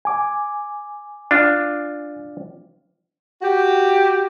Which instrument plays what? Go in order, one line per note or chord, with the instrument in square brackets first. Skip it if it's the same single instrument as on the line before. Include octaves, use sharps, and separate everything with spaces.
[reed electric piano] G#5 D6
[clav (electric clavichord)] D4 F4
[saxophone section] F#4 G4